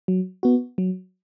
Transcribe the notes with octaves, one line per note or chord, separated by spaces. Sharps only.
F#3
B3 F#4
F#3